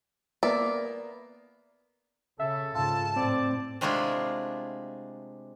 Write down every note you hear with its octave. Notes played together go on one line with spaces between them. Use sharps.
A#3 B3 D5 E5
C#3 A4 E5
G#2 C#3 F4 A5
A2 C4 D5
C3 G#3 A3 D4 E4 F4